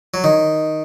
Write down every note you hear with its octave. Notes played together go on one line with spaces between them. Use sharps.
F#3
D#3